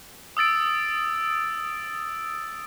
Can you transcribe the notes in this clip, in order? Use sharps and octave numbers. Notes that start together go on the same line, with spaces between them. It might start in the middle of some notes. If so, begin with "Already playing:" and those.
D#6 E6 A6 D7